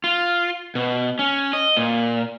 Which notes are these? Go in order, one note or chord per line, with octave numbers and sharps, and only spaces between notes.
F4
B2
C#4
D#5
A#2